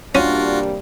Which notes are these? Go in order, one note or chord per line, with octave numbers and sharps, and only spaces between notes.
C3 G3 A#3 C#4 D4 F4 F#4